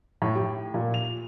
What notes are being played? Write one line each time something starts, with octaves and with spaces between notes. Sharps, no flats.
A2
G4
A#2
F7